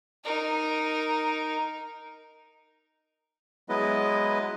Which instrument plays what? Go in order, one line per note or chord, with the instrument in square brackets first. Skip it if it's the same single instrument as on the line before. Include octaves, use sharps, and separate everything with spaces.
[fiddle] D#4 A#4
[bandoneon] F#3 G#3 B3 E4 B4 D#5